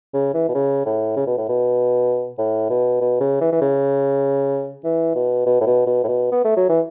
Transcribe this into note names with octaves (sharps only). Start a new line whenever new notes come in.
C#3
E3
B2
C#3
A2
C#3
B2
A2
B2
A2
B2
B2
C#3
E3
E3
C#3
E3
B2
B2
A2
B2
B2
A2
B2
B3
A3
F#3
E3